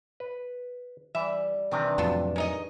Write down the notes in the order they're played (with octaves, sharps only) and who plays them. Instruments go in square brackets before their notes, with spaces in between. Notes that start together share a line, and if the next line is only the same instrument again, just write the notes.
[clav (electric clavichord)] B4
[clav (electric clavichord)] E3 [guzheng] G3 [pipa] E5
[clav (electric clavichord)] C3 D#3 C4 [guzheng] E3 D4 G4
[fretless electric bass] F2 A2 F#3 [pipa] B3 F4 A4
[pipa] G#3 D#4 D#5 [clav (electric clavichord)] A#4 [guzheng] C#5